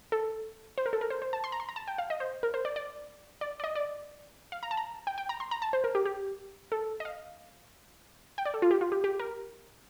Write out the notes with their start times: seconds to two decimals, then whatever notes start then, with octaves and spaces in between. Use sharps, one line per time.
0.12 A4
0.78 C5
0.86 A#4
0.93 A4
1.01 A#4
1.10 C5
1.22 C5
1.33 A5
1.44 C6
1.52 A#5
1.60 C6
1.69 A#5
1.76 A5
1.88 G5
1.98 F5
2.10 D#5
2.20 C5
2.43 A#4
2.54 C5
2.65 D5
2.76 D5
3.41 D5
3.60 D5
3.64 D#5
3.75 D5
4.52 F5
4.63 A#5
4.71 A5
4.77 A#5
5.07 G5
5.18 G5
5.29 A#5
5.40 C6
5.51 A#5
5.62 A5
5.73 C5
5.84 A#4
5.95 G4
6.06 G4
6.72 A4
7.00 D#5
7.05 F5
8.38 G5
8.46 D5
8.54 A4
8.62 F4
8.71 G4
8.81 F4
8.92 G4
9.04 G4
9.20 A#4